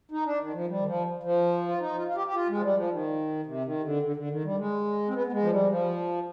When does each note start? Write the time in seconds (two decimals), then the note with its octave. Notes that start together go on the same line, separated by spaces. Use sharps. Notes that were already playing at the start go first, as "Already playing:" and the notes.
0.11 D#4
0.26 D4
0.40 D#3
0.53 F3
0.67 G3
0.80 D#3
0.86 F3
1.23 F3
1.68 F4
1.80 D#4
1.97 F4
2.08 F4
2.16 G4
2.27 G4
2.35 F4
2.49 G#3
2.58 F3
2.63 G3
2.77 F3
2.91 D#3
3.46 C3
3.65 D#3
3.83 D3
4.03 D3
4.16 D3
4.30 D#3
4.44 G3
4.58 G#3
5.09 C4
5.14 B3
5.27 B3
5.33 G#3
5.42 F3
5.51 G3
5.69 F3